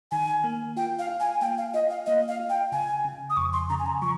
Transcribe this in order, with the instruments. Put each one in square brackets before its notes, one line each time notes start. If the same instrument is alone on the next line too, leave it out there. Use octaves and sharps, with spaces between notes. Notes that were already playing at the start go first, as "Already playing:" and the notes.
[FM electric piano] D#3 [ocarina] G#5
[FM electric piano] A#3
[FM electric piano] F4 [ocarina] G5
[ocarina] F5
[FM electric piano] F4
[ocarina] G#5
[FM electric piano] A#3 [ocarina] G5
[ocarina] F5
[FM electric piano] F4 [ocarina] D#5
[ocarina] F5
[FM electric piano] A#3 [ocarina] D#5
[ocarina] F5
[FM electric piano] F4
[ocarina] G5
[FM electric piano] C#3 [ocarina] G#5
[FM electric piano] C#3
[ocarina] D#6
[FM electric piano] F2 [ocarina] C#6
[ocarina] C6
[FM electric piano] C#3 [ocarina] A#5
[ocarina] G#5
A#5
[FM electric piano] F3 [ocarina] C#6